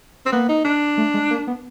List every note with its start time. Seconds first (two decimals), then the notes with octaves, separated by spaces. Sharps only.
0.26 C4
0.32 A#3 B3
0.49 D#4
0.65 D4
0.98 A3
1.14 G#3
1.30 A#3
1.47 B3